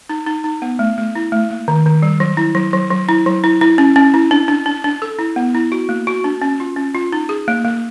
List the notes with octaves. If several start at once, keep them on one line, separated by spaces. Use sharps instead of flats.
D#4
D#4
D#4
B3
A3
A3
E4
A3
A#3
D#3
D#3
G3
F#3
E4
F#3
F#3
F#3
E4
F#3
E4
E4
C#4
C#4
E4
D4
D4
D4
D4
A4
E4
B3
E4
F#4
A#3
F#4
D4
C#4
F4
C#4
F4
D#4
G#4
A#3
A#3